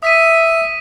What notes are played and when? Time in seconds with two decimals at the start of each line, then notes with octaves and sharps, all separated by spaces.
0.03 E5 D#6 B6 D#7